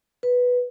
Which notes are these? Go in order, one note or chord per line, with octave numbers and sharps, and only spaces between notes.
B4